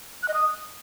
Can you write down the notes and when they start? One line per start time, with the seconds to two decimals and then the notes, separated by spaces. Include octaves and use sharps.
0.23 F#6
0.28 D#5
0.34 D#6